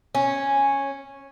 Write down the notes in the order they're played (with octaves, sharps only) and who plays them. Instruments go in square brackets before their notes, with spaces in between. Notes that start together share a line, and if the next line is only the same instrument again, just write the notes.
[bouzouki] C#4